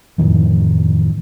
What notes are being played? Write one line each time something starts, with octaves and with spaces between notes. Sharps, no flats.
F2 A2 D#3 E3